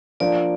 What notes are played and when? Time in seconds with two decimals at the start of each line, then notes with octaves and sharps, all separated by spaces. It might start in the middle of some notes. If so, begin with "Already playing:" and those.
0.20 F3 A#3 D4 F4 D5